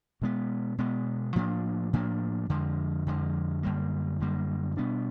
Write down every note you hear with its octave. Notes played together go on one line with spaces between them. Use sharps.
B2 G#3 B3
B2 G#3 B3
A2 F3 A#3 D4
A2 F3 A#3 D4
F2 D3 F3 G#3
F2 D3 F3 G#3
F#2 D3 G3 A#3
F#2 D3 G3 A#3
B2 G3 B3 D4